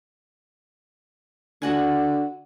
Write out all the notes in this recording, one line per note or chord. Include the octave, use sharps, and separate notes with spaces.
D3 F#4 F#5 G#5